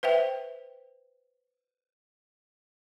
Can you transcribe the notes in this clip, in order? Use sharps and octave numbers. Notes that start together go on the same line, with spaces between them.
B4 C5 E5 G5